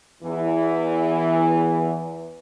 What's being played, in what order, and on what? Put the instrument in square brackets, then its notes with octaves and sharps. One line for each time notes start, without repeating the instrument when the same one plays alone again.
[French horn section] E2 E3